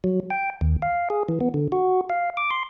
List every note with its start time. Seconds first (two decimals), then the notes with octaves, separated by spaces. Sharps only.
0.04 F#3
0.30 G5
0.61 D#2
0.82 F5
1.10 G#4
1.28 E3
1.41 B3
1.54 D3
1.72 F#4
2.10 F5
2.37 D6
2.51 C6